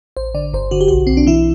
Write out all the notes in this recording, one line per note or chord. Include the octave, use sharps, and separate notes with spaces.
A1 C5
D3 D5
G1 C5
D3 F#4
G4
B1 F#4
B1 C4
D4
E3 E4